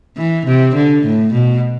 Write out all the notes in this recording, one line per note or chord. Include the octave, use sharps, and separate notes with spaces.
E3
C3
D3
A2
B2